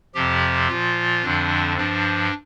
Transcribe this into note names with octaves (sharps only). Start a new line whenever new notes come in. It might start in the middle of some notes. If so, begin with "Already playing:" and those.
F2 C3 F3 G4
A#2 F3 F4
F2 D3 F3 D4
G2 F3 D4